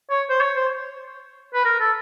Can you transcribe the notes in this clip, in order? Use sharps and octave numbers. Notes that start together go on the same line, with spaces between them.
C#5
C5
C#5
C5
B4
A#4
A4